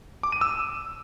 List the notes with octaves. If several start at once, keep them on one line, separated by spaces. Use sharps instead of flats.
D6
D#7
E6